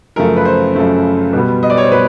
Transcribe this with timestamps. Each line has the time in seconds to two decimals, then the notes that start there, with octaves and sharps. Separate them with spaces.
0.16 F#2 C#3 F3 A3 A#4
0.36 B4
0.45 C5
0.75 F#2 C#3 F3 A3
1.33 B2 G3 B3
1.63 D#5
1.70 D5
1.77 C#5
1.84 C5
1.91 B2 B4